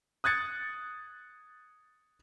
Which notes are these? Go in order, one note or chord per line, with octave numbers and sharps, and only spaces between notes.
D#6 F#6 G#6 A6 C#7